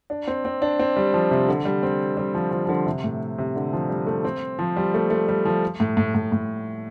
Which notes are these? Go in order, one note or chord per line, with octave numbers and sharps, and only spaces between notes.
D4
C4
C4
D4
C4
G3
F3
C3
D3
G3
C4
G3
F3
F3
F3
D3
C3
A2
C3
D3
F3
G3
A3
C4
F3
G3
A3
A3
G3
F3
A2
A2
A2
A2